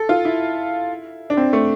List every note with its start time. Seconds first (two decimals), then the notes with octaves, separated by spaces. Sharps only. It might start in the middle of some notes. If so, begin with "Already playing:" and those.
Already playing: A4
0.09 F4
0.25 E4
1.30 D4
1.37 C4
1.53 A3